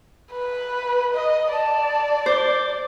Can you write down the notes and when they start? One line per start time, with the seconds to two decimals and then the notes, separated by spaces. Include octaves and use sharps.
0.32 B4
1.14 D#5
1.52 D5 A5
2.26 C5 D6